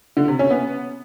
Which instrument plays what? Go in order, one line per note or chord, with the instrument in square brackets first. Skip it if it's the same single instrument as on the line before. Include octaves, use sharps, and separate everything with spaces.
[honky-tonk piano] D3
C3
C#4
B3